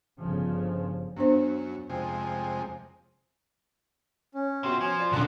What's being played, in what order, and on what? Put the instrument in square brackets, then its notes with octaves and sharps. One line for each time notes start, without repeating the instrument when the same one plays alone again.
[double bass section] G1 C#3 F3
[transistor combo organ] F#2 [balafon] B3 D4 C5
[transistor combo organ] F2 C3 G#3
[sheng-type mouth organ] C#4
[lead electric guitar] C3 [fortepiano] B3 F4 F#4
[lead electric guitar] F3 [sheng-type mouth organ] G#5
[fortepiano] F4 D5
[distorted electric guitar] B1 D3 [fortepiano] F#5 [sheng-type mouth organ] A#5 F#6